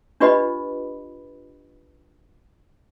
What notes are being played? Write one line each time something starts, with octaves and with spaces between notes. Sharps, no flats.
D4 F4 G4 B4 D#5 B5